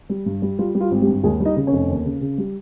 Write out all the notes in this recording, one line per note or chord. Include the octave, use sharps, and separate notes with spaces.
G3
G2
G3
G3 F4
G3
F4
G#1
G3 G4
G2
D#2 G#3 G#4
G3
D#4 D#5
C#3
C#4 C#5
F1
D#2
C#3
C#3
G3